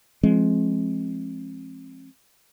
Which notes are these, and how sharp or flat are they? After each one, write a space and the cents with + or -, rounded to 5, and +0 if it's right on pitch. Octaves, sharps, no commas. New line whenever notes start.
F3 -20 G#3 +20 C4 +30